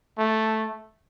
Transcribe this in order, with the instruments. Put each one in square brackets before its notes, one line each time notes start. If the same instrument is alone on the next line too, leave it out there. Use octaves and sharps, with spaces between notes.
[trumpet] A3